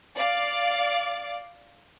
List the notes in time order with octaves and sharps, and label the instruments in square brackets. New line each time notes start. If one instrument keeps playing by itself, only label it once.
[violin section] D5 F5 D6